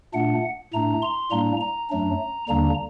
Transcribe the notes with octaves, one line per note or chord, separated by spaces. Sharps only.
A#2 A3 D4 F#5
A2 A3 D4 A#5
C6
A2 G3 A#3 D4 A#5
A#5
F#2 F#3 A3 D4
D#2 D3 G3 A#3 D4 A#5